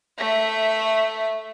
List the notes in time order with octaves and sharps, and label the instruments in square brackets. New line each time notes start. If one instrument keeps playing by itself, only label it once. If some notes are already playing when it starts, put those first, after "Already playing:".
[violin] A3 E5